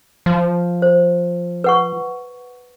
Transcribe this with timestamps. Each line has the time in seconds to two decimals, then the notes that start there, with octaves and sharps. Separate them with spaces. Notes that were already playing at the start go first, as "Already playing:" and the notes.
0.26 F3
0.82 C5
1.64 B4 F#5 C#6